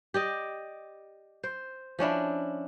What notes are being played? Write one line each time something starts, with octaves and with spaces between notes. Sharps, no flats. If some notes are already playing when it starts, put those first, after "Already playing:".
G4 D5 D#5
C5
F3 C#4 D4 E4